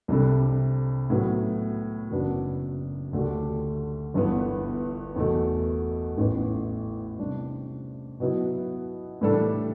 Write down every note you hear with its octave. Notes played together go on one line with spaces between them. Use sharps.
C2 C3 G3 D4 A4
A2 F#3 B3
F#1 F#2 F#3 B3 D4
D2 D3 A3 D4 G4
G1 G2 E3 B3
E2 B2 A3
A1 A2 E3 B3
C3 G3 D4
B2 F#3 B3 E4
A2 E3 G3 D4 A4